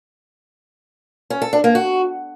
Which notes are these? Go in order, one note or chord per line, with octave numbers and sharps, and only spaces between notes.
C#4
A4
D4
A#3
F#4